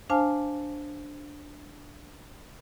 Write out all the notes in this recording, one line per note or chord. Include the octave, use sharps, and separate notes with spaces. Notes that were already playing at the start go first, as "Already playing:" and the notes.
D4 C5 F5 G#5 A5 F6